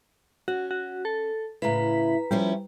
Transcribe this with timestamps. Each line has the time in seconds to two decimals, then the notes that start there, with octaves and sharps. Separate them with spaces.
0.48 C#4 F#4
0.71 F#4
1.05 A4
1.62 A2 C#3 E4 B4 A#5 B6
2.31 F3 G3 C#4 E4